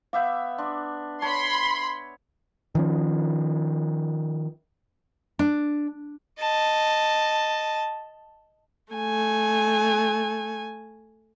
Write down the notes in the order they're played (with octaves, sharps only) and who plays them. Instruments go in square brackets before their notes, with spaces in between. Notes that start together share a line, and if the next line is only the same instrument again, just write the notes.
[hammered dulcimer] B3 E5 D6 [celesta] F5 G6
[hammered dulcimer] D4 [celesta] C6 D6
[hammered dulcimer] C#5 [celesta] A5 [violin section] B5 C6
[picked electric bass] D#3 F3 C#4
[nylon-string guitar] D4
[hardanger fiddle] D#5 A5
[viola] A3 G#5